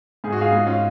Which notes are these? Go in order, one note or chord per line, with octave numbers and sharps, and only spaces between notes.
G#2 G#4
F#4
F4 G#4
G#2
C#4 F4